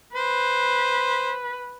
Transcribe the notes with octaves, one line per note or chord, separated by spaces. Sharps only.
B4 C5